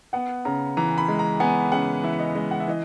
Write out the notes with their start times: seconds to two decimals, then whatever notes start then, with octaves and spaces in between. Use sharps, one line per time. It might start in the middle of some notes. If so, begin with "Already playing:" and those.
0.13 B3 F#5
0.45 C#3 A#5
0.77 E3 A#5
0.98 B5
1.08 G#3
1.19 A#5
1.40 B3 G#5
1.72 C#3 F#5
2.03 E3 E5
2.19 D#5
2.35 G#3 D#5
2.51 F#5
2.60 E5
2.68 E3 D#5